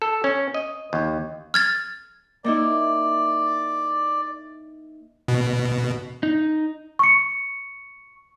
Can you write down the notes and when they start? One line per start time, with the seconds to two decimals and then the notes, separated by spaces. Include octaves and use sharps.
0.02 A4
0.24 C#4
0.54 D#5
0.93 D#2
1.54 F6 G#6 A6
2.44 A#3 D#4 E4 D5
5.28 B2
6.23 D#4
6.99 C#6 C#7